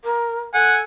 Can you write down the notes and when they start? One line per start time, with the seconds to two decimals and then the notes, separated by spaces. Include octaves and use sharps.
0.04 A#4
0.54 A4 F#5 G#5